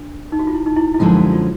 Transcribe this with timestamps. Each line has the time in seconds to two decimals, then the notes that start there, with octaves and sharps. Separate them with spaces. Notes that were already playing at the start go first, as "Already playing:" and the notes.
Already playing: D4
0.32 D#4
0.39 F#4
0.47 F4
0.54 E4
0.66 D#4
0.77 E4
0.94 E4
0.99 F#2 D3 F3 G#3 C#4 F4
1.17 F#4
1.33 F4